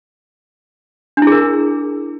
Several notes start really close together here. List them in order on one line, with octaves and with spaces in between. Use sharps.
D4 E4 G#4 A#4